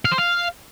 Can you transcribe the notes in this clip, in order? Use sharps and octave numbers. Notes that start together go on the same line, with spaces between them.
F5
C5
F5